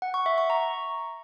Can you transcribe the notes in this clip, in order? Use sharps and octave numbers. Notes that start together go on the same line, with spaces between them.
F#5
C#6
E5
C#6
A#5